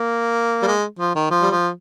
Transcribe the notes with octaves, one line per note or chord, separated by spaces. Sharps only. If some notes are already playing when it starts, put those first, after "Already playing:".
Already playing: A#3
G3
G#3
F3
D#3
F3
G3
F3